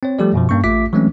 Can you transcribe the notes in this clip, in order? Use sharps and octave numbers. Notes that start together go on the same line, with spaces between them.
C4 C#5
F3 G3 A3 G4 A4 D5
F#2 B2 F3
G2 A#3 C#4 C#6
A1 A3 F4 E5 D6 B6
E3 F#3 G#3 A3 C4 C#4